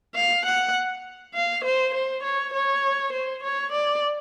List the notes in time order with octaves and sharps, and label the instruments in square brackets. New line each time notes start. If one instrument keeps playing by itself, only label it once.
[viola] F5
F#5
F5
C5
C5
C#5
C#5
C5
C#5
D5